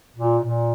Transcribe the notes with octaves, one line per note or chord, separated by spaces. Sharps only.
A#2
A#2